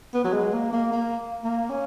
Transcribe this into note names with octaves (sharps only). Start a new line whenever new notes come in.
B3
F#3
G#3
A#3
A#3
A#3
A#3
C#4